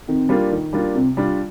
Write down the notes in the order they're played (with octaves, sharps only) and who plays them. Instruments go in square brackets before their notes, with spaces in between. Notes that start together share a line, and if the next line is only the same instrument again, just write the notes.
[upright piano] D#3 [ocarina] C4
[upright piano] G3 A#3 D4 F4
D#3
G3 A#3 D4 F4
[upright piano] C3 [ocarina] C4
[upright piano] G3 D4 F4